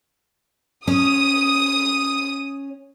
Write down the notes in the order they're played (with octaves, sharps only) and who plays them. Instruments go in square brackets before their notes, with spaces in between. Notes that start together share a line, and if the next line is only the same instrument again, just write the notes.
[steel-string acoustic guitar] C#4 [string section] D#6